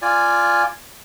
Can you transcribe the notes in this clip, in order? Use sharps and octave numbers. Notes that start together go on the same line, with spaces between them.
F4 D5 G#5